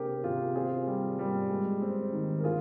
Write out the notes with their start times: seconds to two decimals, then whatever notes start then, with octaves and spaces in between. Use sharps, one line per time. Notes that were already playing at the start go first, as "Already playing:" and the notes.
Already playing: C3 D4 G4 G#4 A#4 C5
0.24 C3 F4 G#4
0.55 C4 F4 G#4
0.87 G3
1.19 G3
1.50 G#3
1.82 C4
2.13 D#3
2.38 A#4
2.44 D3 F4 G#4